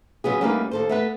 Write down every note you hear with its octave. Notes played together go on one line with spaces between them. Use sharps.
C#3 F#3 B3 G#4
D2 G3 A#3 C#4 D#4 B4
D#2 A4 C5
A3 B3 B4